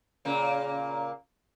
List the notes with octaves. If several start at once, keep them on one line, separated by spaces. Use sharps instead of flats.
A#2 C#3 A#3